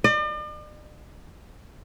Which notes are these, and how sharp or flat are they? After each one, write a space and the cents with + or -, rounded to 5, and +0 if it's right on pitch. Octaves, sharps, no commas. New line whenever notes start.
D5 +45